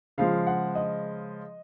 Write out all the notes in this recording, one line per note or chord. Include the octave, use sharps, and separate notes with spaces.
C#3 F3 G#3 F5
F#5
D#5